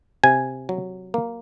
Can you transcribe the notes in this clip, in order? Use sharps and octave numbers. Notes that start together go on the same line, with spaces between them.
C3 G#5
F#3
A#3